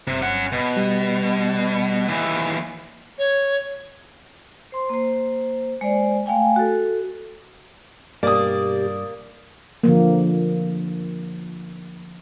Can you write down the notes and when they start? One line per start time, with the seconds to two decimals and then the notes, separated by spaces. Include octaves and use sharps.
0.07 G1 C3
0.21 C#4 F#5
0.52 B2
0.76 G3
2.08 D#2 E3
3.18 C#5
4.72 C5 C6
4.89 A#3 C5
5.81 G#3 C5 D5
6.26 A3 F5 G5 G#5
6.56 F#4 A4
8.23 G2 B2 A#3 G4 D5 D#6
9.83 D3 F3 A#3